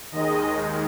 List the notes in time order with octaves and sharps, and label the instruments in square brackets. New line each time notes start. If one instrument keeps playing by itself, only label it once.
[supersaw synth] D#2 D#3 G#3 D#5